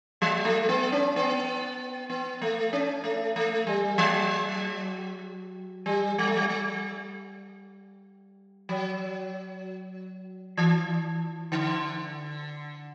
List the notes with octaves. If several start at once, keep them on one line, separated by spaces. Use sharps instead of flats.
F#3
A3
B3
C#4
B3
B3
A3
C#4
A3
A3
G3
F#3
G3
G3
A3
G3
G3
F#3
E3
D3